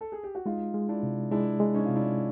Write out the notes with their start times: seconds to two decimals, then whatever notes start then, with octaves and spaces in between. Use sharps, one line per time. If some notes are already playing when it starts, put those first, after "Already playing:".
0.01 A4
0.12 G#4
0.23 G4
0.35 F#4
0.46 G#3 D#4 F4
0.74 G#3
0.88 D4 E4
1.03 C3
1.31 G#3 D4 E4
1.60 G#3
1.74 C#4 D#4
1.85 C3 F4
1.96 D4 E4